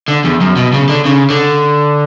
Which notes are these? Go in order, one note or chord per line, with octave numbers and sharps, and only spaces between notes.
D3
E2
F#2
B2
C#3
D3
C#3
D3